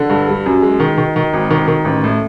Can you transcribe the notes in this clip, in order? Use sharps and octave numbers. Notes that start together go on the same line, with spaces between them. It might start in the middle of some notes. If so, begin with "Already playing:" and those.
Already playing: D3
G2
G3
F#2
G#3
D#3
D#3
D#3
G#1
D#3
D#3
A1
A2